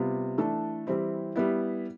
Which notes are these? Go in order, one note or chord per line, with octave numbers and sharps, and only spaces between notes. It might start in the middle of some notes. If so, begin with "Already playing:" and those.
Already playing: C3 G3 B3 F4
E3 A3 D4 A4
E3 G3 C4 E4
G3 B3 E4